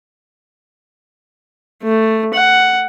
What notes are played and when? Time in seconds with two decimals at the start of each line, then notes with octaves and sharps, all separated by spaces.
1.83 A3
2.34 F#5